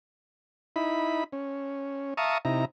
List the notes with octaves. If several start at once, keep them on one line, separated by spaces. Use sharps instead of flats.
D#4 E4 B5
C#4
E5 F5 A5 A#5 C#6 D#6
C3 D#4 E4 A#5